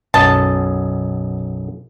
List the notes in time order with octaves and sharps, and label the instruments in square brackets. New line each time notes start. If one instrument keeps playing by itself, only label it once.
[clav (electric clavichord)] B1 F#2 D#5 [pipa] A5